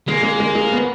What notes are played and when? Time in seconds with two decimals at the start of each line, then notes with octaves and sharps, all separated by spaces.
0.08 G#3 A#3
0.23 G#3
0.40 G#3
0.55 G#3
0.72 B3